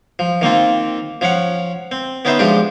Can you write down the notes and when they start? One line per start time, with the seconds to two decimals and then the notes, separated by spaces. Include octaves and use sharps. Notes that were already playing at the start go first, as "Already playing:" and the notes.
0.19 F3
0.42 D#3 A#3 C4 F4
1.21 F3 C#4 F5 F#5
1.92 C4
2.25 B3 C#4 D#4 B4 C5 E5
2.39 F3 G#3 D4 G4